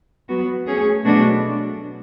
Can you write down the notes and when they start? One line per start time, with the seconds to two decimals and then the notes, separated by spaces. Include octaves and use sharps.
0.29 F#3 B3 F#4
0.67 A3 C#4 G#4 C#5
1.05 B2 F#3 A3 D4 F#4